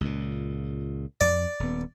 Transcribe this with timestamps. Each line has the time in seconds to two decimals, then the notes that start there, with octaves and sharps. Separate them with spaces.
0.01 C#2 A#2
1.21 F2 D5
1.60 D#1 B3